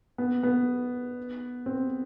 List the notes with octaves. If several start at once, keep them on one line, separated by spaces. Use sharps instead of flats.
B3
B3
C4